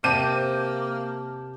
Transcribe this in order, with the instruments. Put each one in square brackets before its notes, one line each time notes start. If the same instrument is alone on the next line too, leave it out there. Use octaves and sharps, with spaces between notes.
[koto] C3 [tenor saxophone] A#3 [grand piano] A5 D6 G6 [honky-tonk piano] D#7